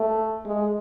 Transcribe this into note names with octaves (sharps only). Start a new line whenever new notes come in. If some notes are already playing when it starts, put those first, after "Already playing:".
Already playing: A3
G#3